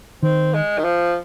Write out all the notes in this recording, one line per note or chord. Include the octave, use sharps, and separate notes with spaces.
D#3 C4
G#3
D#3
F3